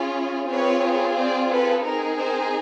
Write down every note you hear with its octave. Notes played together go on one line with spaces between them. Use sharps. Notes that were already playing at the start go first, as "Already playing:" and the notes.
Already playing: C#4 F4 G#4
C4 F4 G#4 B4 C#5
C5 D5
A4 B4
C4 D#4 G#4 A#4
A#4 C5